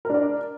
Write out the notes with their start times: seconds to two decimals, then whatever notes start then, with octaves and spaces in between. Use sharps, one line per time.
0.05 A#4
0.10 D4
0.14 D5